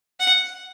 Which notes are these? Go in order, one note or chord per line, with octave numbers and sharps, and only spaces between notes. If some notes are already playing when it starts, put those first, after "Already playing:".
F#5